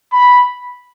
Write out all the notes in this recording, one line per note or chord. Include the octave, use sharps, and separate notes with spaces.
B5